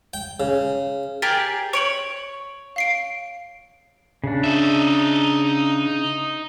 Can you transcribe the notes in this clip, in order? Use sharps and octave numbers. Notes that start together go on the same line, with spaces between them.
G5
C#3
G4 G#4 A#4 A6
C#5 C#6 D7 F#7
F5 C7 D7
C#3 D4
D#4 E5